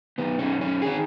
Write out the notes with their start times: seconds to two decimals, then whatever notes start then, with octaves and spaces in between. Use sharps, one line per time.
0.18 F#2 D#3 B3
0.39 C#4
0.61 C#4
0.82 D#3 G#4